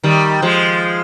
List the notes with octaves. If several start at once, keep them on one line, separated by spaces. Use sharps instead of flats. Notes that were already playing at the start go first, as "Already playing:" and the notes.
D#3 G3
F3 G#3